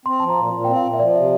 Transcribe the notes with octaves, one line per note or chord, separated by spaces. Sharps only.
C4 C6
F3 A5
A#5
A#2
A#2
C4 G5
F5
A#2
E5
F3 D5
C3 E5